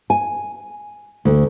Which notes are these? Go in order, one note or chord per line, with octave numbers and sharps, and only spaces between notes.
G#5
D2